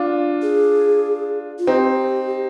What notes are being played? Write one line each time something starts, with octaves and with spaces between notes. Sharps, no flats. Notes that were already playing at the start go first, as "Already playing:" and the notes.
Already playing: D4 F4
G#4
F4
C4 D#4 G4